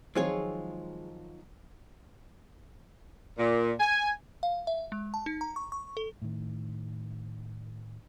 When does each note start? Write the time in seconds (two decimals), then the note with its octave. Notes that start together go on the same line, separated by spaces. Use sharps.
0.15 D#3 F3 F#3 G#3 C4 F4 G#4 C#5
3.38 A#2
3.80 G#5
4.43 F5
4.67 E5
4.92 G#3
5.14 A5
5.26 D#4
5.41 A#5
5.56 C#6
5.72 C#6
5.97 A4
6.22 A2 D#3